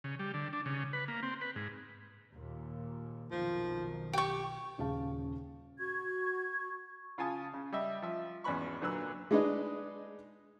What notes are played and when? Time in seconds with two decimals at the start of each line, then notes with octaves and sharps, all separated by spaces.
0.04 C#3
0.19 G3
0.34 D3
0.53 D4
0.66 C#3
0.93 B4
1.08 A#3
1.23 C4
1.41 B4
1.56 G#2
2.33 D#2 A#2
3.31 B1 F2 D#3 F3
4.13 G4 G5 C#6
4.78 D#1 C#3 G#4 F5 A5
5.78 F#4 C#6 G#6
7.18 C#3 F4 F5 G#5 A5 D#6
7.54 C#3
7.72 G3 D#5 E5
8.02 F3 E5
8.44 G#1 E2 C#4 B4 B5 C#6
8.81 A#2 D3 F#3 B4 E6
9.31 G#3 D4 D#4 G#4 B4 D#5